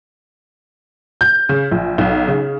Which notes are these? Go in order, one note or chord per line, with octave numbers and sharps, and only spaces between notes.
G6
C#3
A#1
B1
C#3